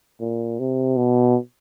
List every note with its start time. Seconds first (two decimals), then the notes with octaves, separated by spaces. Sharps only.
0.21 A#2
0.59 C3
0.97 B2